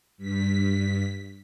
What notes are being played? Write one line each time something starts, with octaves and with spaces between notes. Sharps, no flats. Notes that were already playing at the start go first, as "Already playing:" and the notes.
G2 B6